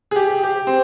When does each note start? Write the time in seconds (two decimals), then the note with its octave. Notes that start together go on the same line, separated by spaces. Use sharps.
0.11 G#4
0.16 G4
0.44 G4
0.67 C4